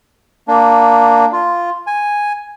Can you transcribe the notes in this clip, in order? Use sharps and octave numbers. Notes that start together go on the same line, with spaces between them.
A#3 D4
F4
G#5